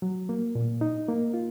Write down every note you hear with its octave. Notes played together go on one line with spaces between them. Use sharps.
F#3
A#3
A#2
D#4
A#3
F4